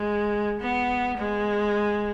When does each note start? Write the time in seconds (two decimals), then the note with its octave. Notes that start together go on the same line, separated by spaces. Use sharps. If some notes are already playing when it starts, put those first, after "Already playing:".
Already playing: G#3
0.61 B3
1.17 G#3